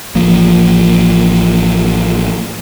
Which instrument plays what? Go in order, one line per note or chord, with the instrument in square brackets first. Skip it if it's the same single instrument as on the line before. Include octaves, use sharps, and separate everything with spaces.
[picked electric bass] A1 F3 A#3